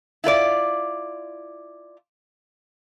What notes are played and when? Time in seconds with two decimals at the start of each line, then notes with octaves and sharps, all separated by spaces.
0.24 E4 F4 B4 D5